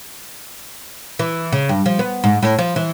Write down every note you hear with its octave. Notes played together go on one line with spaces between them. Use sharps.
E3
C#3
G2
F3
B3
G#2
A2
F3
E3